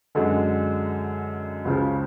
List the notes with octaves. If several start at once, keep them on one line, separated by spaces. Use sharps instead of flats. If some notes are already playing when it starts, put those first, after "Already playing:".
F#2 D3 G#3
C#2 C#3 F3